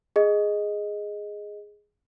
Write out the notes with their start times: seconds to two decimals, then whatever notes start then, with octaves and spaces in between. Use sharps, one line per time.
0.16 G#4 D#5